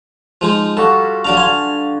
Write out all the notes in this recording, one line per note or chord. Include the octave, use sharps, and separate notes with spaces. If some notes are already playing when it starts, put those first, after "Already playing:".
F3 G#3 D#4
G3 F4 F#4 A4
D3 F#3 D5 F5
F5 G#5 C6